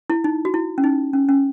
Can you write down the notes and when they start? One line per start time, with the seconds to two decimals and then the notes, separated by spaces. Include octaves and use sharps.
0.10 E4
0.24 D#4
0.45 F#4
0.54 E4
0.78 C#4
0.84 D#4
1.13 C#4
1.29 C#4